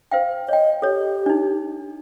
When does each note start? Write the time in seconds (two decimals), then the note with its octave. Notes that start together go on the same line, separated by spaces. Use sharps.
0.12 C5 F5 G5
0.49 C#5 D#5 G5
0.82 G4 A4 C#5
1.26 D4 D#4